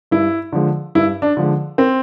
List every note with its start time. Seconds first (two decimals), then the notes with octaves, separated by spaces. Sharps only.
0.11 G2 E4
0.53 D3 F3 G#3
0.95 G2 E4
1.22 D4
1.37 D3 F3 G#3
1.78 C4